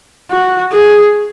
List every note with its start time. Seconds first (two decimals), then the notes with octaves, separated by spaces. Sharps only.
0.31 F#4
0.72 G#4